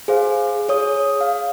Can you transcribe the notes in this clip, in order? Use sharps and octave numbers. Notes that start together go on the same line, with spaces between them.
G#4 C5 F5
G#4 C#5 D#6
F5